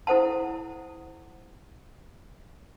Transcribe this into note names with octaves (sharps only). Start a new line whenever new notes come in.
E4 A4 C5 F#5 A5